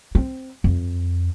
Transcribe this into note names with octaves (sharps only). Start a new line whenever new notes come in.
C4
F2